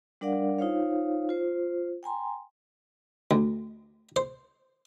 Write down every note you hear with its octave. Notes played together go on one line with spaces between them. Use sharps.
G3 D4 A#4 D5 F5 F#5
D#4 F4 C5 C#5 F5
F4 C5
G5 G#5 A#5 C6
D2
C5